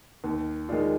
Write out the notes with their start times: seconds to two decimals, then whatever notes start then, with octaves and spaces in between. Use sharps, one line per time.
0.24 D#2
0.69 D#3 G#3 D4 F4